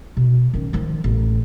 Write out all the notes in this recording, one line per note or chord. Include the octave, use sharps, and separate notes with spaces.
B2
D#3 C#4
D#3 F3
A1